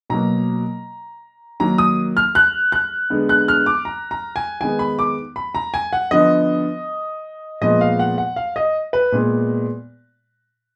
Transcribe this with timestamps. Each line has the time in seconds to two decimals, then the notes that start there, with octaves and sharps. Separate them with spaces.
0.10 B2 F#3 A#3 A#5
1.60 D#3 F#3 A#3 A#5
1.78 D#6
2.17 F6
2.35 F#6
2.72 F#6
3.10 D3 G#3 B3
3.29 F#6
3.48 F6
3.66 D6
3.85 A#5
4.11 A#5
4.36 G#5
4.61 D#3 G#3 B3 G#5
4.79 B5
4.99 D6
5.36 B5
5.55 A#5
5.74 G#5
5.93 F#5
6.11 D3 F3 B3 D#5
7.61 A#2 F3 G#3 B3 D#5
7.81 F5
7.99 F#5
8.18 F#5
8.36 F5
8.56 D#5
8.93 B4
9.12 A#2 G#3 B3